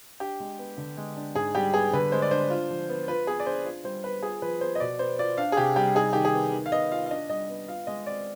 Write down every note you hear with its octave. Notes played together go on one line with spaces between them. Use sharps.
D4 G4
G#3
B3
D3
G#3
D4
G#2 G#4
G3 G4
B3 G#4
D3 B4
G#3 C5
D5
D4 C5
F4
F3
B3
F4 B4
B3 G#4
D5
D4 C5
F4
G3 C5
B3 B4
F4 G#4
F3 B4
B3 C5
D#5
B2 D5
B3 C5
F4 D5
D4 F5
G#4
C3 G4
G3 G4
D#4 G#4
D#3 G4
G#4
B3
D#3
F5
B3 D#5
F4 F5
F5
D4 D#5
G3 D#5
B3
F4 F5
G#3 D#5
C4 D5